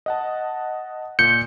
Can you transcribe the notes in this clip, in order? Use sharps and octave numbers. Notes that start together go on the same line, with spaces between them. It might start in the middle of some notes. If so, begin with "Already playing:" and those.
D#5 F#5 A5
A#2 G6 C#7